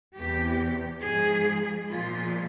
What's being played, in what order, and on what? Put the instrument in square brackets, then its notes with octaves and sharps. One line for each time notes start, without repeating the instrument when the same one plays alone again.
[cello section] E2 C3 E3 G4
G#2 F3 G#3 G#4
A#2 F3 G#3 F4